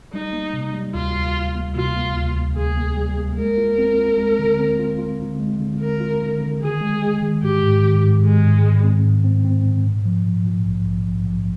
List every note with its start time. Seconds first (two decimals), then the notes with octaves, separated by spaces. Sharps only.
0.13 G3 D#4
0.33 A#3
0.53 C3
0.73 G3
0.94 D2 F4
1.15 D2
1.34 D2
1.55 A#3
1.75 C3 F4
1.96 A#3
2.16 D2
2.36 D2
2.56 D2 G#4
2.77 A#3
2.97 G3
3.17 A#3
3.37 G#3 A#4
3.58 F4
3.78 C4
3.98 F4
4.18 G#3
4.39 D3
4.59 C4
4.79 F4
4.99 F4
5.19 D3
5.39 G#3
5.59 D3
5.80 D3 A#4
6.00 F4
6.20 D3
6.41 D3
6.61 D#3 G#4
6.81 G#3
7.02 G#3
7.22 D#3
7.43 G#2 G4
7.63 G#2
7.83 D#3
8.04 G#2
8.23 D#3 G#3
8.43 G#2
8.64 G#2
8.83 C4
9.04 G#2
9.24 C4
9.45 C4
9.65 G#2
9.85 A#2
10.05 F3
10.26 A#2
10.46 A#2
10.66 A#1
10.87 A#1
11.07 A#1
11.27 A#1